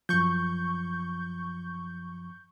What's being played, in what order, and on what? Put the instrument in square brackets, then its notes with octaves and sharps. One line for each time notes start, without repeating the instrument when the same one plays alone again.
[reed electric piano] F#2 F3 [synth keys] C#6 G6